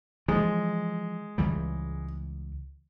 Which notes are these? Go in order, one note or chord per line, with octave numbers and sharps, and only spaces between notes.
E3 F3 G#3
C#2 E3 G3